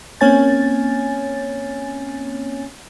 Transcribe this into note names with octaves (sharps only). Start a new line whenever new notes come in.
A#3 C4 C#4 C#5 G#5 A6